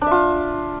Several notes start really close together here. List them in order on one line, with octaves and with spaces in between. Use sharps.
D4 E5 F4